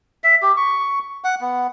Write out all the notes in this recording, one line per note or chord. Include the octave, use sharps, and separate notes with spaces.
E5
G4
C#6
F#5
B3